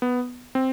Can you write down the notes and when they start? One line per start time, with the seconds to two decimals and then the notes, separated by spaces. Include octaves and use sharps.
0.02 B3
0.55 C4